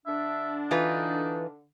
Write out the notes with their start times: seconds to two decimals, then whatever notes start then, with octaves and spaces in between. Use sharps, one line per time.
0.06 D3 D4 E5
0.71 E3 D#4 F4 B4